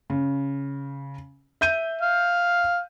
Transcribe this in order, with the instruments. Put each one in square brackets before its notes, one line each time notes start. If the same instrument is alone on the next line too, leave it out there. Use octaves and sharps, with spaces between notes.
[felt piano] C#3
E5 G6 D#7
[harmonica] F5